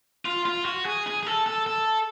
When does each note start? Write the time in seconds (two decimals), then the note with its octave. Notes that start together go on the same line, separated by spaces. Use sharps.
0.25 F4
0.45 F4
0.65 F#4
0.85 G#4
1.07 G#4
1.23 G#4
1.26 A4
1.46 A4
1.67 A4